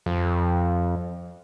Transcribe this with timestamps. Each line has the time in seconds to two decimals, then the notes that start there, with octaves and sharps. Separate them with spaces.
0.06 F2